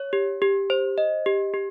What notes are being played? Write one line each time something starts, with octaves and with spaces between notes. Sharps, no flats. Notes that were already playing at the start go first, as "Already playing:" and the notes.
Already playing: C#5
G4
G4
C5
D#5
G4
G4